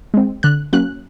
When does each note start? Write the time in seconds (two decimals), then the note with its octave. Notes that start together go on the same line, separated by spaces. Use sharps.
0.14 G#3 C4
0.43 D3 F#6
0.73 F#3 A#3 C#4 F#6